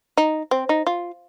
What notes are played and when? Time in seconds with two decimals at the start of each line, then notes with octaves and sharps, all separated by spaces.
0.17 D#4
0.51 C4
0.69 D#4
0.87 F4